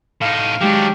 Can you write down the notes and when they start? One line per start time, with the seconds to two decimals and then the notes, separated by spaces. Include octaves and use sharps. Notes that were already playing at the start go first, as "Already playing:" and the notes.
0.22 A2 D#4 F5
0.61 D#3 F#3 G#3 D4 G4